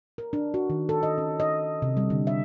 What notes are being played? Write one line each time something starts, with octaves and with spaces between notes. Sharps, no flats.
A#4
D4
F#4
D#3
A4
D#5
C#4
D#5
C3
G3
D3
E5